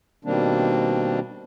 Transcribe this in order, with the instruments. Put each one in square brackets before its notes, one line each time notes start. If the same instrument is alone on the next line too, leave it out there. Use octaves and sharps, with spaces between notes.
[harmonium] B2 D#3 G3 A#3 C4 D4